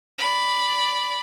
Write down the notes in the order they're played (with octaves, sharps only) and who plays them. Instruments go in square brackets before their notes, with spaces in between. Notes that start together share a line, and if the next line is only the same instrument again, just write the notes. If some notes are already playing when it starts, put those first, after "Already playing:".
[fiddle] D5 B5